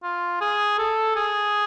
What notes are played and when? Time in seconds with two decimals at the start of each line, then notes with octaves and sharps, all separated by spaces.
0.03 F4
0.41 G#4
0.78 A4
1.16 G#4